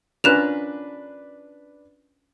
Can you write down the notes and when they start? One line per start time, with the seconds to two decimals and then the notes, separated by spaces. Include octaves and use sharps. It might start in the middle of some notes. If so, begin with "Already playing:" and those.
0.24 C#4 D4 F4 A#4 B4 F#6 E7 F7